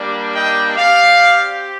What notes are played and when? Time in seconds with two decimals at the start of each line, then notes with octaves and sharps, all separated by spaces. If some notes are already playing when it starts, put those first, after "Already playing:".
Already playing: G3 A#3 D4
0.35 D#5 G5
0.77 C4 G4 D5 F5